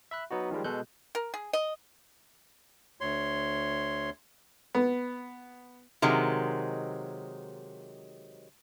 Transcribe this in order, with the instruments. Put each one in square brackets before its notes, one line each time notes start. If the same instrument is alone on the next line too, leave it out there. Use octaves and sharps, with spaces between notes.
[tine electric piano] E5 B5 F#6
F#3 B3 D#4 F#4
D#3 F3 G3 G#3
B2 G#3 A4 F#6 G6
[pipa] A#4
G#4
D#5
[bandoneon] D2 C#5 C6
[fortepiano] B3
[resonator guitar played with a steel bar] C3 D#3 F#3 G#3